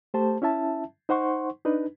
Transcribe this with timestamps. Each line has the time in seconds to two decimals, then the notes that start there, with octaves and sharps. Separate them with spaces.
0.14 A3 G4 C5 A5
0.42 C#4 E4 E5 A5
1.09 D#4 C5 F#5 C6 C#6
1.65 D4 D#4 B4